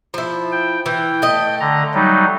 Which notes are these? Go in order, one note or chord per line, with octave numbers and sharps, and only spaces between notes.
F3 E4
G5
E3 G5
A3 D#5
D3 A#5
F#3 G3 D#4